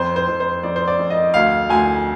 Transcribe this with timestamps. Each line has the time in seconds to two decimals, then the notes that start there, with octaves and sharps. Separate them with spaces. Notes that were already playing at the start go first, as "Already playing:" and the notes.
Already playing: F2 C5
0.16 C5
0.28 F2
0.40 C5
0.63 F2 D5
0.76 C5
0.88 D5
0.99 F2
1.10 D#5
1.34 D2 F5
1.69 D2 G#5